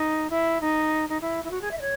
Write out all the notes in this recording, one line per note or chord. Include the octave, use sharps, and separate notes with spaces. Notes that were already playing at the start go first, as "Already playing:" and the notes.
Already playing: D#4
E4
D#4
D#4
E4
E4
F#4
G#4
E5
D#5
C#5